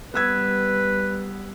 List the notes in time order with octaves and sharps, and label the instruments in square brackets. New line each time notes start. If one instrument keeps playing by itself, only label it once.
[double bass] G3 [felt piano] B3 E6 G#6 [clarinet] B4